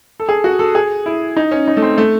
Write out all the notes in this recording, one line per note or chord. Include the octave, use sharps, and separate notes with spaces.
A4
G#4
F#4
A4
G#4
E4
D#4
C#4
D#4
A3
C4
A3